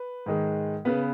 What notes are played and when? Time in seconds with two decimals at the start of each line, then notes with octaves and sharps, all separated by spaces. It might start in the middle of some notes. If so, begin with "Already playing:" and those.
Already playing: B4
0.26 G#2 D#3 G#3
0.85 C#3 B3 B4